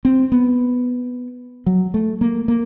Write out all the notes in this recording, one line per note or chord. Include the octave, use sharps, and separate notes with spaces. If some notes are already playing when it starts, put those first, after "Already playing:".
C4
B3
F#3
A3
A#3
A#3